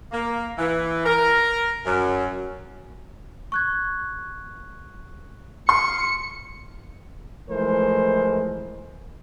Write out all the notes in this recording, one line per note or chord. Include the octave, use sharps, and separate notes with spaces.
A#3
E3
A#4
F#2
C#6 F#6 G#6
C6 F6 C#7
E3 F3 G#3 A3 A#4 C5